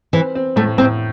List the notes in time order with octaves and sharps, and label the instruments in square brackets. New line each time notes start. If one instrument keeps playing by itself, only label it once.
[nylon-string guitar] E3 [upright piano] C4
[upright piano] C4
[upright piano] A2 [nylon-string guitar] A3
[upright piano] A2 [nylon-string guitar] C4